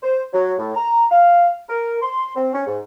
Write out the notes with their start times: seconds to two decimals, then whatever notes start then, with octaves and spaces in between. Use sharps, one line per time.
0.03 C5
0.33 F#3
0.58 A2
0.75 A#5
1.11 F5
1.69 A#4
2.02 C6
2.36 C4
2.53 C#4
2.67 G#2